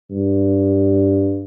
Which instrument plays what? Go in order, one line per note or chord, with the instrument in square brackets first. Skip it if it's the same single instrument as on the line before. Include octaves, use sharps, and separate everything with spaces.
[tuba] G2